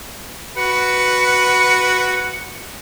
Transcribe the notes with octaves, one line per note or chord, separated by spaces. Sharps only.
F#4 B4 C#7